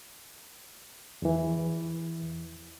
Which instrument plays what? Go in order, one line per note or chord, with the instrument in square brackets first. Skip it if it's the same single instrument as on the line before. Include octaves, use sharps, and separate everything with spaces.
[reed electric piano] E2 E3